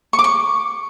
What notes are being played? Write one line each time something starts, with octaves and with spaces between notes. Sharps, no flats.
C#6
D6
C#6